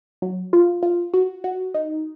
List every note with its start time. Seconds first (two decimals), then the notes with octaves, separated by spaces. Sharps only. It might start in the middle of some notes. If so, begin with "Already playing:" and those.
0.22 F#3
0.53 F4
0.83 F4
1.14 F#4
1.44 F#4
1.74 D#4